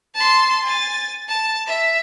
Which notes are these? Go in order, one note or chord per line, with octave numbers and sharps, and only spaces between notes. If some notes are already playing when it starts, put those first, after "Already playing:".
A5 C6
G#5 A6
A5
E5